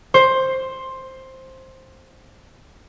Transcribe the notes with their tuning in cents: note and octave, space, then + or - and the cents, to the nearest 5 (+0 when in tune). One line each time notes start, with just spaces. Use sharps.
C5 +10